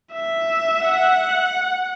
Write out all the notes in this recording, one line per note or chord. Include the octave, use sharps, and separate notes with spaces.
E5
F#5